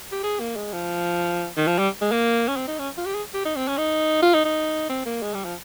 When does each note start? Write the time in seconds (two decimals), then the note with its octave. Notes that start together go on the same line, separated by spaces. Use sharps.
0.11 G4
0.23 G#4
0.39 A#3
0.56 G#3
0.73 F3
1.57 D#3
1.67 F3
1.78 G3
2.01 G#3
2.11 A#3
2.48 C#4
2.56 C4
2.67 D#4
2.78 C#4
2.97 F4
3.06 G4
3.15 G#4
3.34 G4
3.45 D#4
3.55 C4
3.67 C#4
3.78 D#4
4.22 F4
4.34 D#4
4.45 D#4
4.89 C4
5.05 A#3
5.22 G#3
5.34 G3
5.45 F3